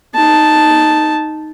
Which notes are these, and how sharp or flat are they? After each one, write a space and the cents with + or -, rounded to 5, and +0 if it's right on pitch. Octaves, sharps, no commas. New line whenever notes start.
D#4 +0 A5 +0